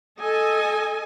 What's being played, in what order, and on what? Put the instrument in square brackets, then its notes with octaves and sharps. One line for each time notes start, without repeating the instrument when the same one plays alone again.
[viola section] A4 D#5 G#5